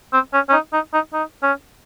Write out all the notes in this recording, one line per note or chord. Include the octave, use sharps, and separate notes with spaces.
C4
C#4
C#4
D#4
D#4
D#4
D#4
C#4